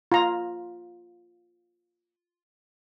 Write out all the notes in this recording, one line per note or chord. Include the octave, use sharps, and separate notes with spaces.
F4 A#5